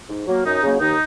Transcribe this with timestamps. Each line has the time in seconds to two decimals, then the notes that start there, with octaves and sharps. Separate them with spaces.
0.09 G#2
0.27 F#3 A#3
0.44 F#2 D#4
0.63 C#3 F#3 A#3
0.80 D#2 D#4